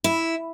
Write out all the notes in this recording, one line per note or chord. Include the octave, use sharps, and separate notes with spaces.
E4